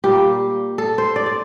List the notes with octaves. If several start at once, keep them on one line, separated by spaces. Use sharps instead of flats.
A#2 G3 A#3 G4
A4
C5
D5
D5